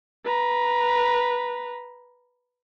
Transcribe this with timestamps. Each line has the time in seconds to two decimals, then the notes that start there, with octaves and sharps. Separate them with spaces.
0.24 B4 A#5